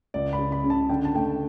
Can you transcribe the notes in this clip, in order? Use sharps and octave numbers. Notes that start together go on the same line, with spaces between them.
C#2 D5
B5
C#3
B5
C#3
A5
D3 G5
A5
A3 G5